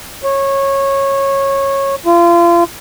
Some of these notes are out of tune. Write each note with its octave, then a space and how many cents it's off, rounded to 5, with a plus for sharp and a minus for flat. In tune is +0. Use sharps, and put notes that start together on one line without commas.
C#5 -15
F4 -30